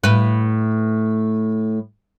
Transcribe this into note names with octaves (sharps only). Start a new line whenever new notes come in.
A2 B4